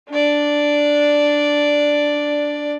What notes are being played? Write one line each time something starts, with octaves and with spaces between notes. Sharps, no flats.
D4 D5